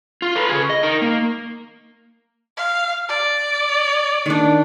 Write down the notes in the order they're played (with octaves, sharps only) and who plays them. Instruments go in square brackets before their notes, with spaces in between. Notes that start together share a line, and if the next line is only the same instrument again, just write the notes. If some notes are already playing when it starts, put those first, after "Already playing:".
[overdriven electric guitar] F4
A4 B4
C#3 G#4
D#5
D#4 A#4
A#3
[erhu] F5
D5
[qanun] D#3 D4